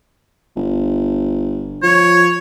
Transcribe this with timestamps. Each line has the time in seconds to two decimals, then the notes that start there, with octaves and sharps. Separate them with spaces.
0.56 G1
1.83 F3 C#5